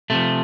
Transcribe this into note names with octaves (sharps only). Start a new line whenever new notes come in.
C3 F3 A3